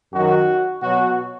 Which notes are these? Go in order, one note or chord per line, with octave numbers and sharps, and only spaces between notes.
F#2 D#3 F#3 F#4
B2 F#3 F#4